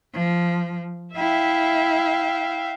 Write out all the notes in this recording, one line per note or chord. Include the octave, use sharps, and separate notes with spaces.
F3
E4 E5 F5 G5